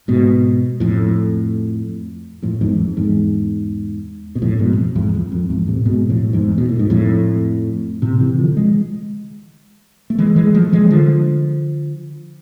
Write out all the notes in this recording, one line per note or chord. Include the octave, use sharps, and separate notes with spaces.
G#2 B2
F2 A2
F2 A2
E2 G#2
F2
E2 G#2
B2
F2 A2
G#2 B2
F2
E2 G#2
F2
F2
E2 G#2
A2 C3
G#2 B2
F2 A2
E2 G#2
B2
A2
G#2
F2 A2
A2 C3
C3 E3
D3 F3
E3 G#3
A3
E3 G#3
E3 G#3
F3 A3
E3 G#3
D3 F3